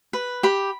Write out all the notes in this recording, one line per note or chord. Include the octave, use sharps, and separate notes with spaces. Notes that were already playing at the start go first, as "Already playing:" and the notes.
B4
G4 B5